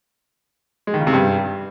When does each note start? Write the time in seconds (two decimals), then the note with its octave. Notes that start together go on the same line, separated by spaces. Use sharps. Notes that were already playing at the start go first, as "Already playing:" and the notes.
0.87 G#3
0.94 D#3
1.00 C#3
1.07 C3
1.13 G2